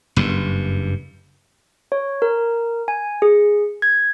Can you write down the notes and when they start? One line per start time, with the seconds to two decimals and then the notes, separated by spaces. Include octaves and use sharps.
0.16 F#1 G2
1.92 C#5
2.22 A#4
2.88 G#5
3.22 G#4
3.82 G#6